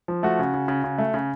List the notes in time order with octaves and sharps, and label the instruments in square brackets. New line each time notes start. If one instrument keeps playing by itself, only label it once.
[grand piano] F3
A3 F#4
C#3
C#3
C#3
C#3
A3
C#3